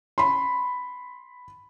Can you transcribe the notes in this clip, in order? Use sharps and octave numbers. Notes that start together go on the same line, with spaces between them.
B5 C6